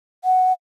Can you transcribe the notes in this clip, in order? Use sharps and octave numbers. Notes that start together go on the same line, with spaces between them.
F#5